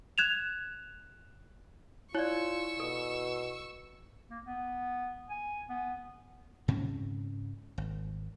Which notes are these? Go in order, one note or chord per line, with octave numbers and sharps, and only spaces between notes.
F#6 G#6 E7 F7
E4 F4 C#5 D5 C#6 E6
B2 A4
A#3
B3
G#5
B3
G#2 C#3 C4 C#4
G#1